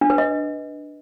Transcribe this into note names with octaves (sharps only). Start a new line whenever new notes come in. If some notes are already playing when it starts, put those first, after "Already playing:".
D4
B4
D#5